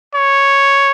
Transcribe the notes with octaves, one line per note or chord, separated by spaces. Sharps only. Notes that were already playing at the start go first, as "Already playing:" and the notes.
C#5